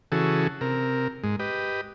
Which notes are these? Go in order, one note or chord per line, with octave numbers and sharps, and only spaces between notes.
C#3 E3 F#4 G#4 A4
C3 A#4
G#2 G#3
G4 B4 D#5